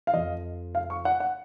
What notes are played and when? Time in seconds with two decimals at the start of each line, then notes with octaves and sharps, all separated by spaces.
0.07 F5
0.13 F2 F3 D#5
0.75 F5
0.90 C#6
1.05 F#5
1.20 F#5